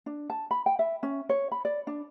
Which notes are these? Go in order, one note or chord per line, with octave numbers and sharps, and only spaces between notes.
D4
A5
B5
G5
E5
C#4
C#5
B5
D5
D4